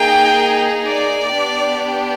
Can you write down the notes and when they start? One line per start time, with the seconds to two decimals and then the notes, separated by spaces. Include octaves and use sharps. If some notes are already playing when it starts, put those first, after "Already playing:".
Already playing: A#3 D#4 G#4 G5
0.86 D5
1.31 B3 D4 G4